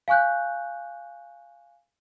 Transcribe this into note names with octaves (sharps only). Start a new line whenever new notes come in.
F5 G#5 C#6 F#6 G6